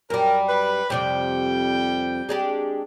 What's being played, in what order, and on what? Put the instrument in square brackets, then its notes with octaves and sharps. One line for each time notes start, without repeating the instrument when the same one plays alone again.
[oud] F#2 G3 [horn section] A#4
[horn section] B4 B5
[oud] F2 C3 D5 [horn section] G3 G5
[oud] G#3 D4 G4